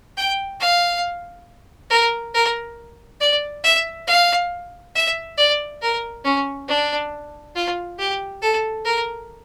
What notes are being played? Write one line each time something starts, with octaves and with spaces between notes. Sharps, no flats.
G5
F5
A#4
A#4
D5
E5
F5
E5
D5
A#4
C#4
D4
F4
G4
A4
A#4